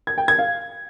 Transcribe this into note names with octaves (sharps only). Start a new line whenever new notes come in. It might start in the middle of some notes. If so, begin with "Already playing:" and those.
G#6
G5
G#6
F5